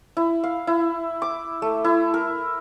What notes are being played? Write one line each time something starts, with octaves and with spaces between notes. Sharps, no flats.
E4
F5
E4
D6
A3
E4
A#4